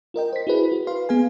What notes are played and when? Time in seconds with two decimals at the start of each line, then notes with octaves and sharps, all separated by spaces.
0.14 F4 A#4 D#5 G5
0.33 C5 B6
0.47 E4 F#4 G#4 B4
0.72 F#4
0.87 B4 F5 C6
1.09 B3 G#4 F5 G#5